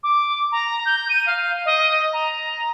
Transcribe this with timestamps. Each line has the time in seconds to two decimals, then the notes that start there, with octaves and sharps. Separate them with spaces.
0.03 D6
0.52 A#5
0.85 G6
1.09 D#7
1.26 F5
1.65 D#5
2.13 A#5